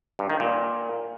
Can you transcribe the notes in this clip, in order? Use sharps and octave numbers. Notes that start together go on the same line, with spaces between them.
G2
D#3
A#2